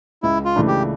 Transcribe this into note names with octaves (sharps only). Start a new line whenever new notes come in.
C#2 E4
F4
C#3 E3 A3 D4
G4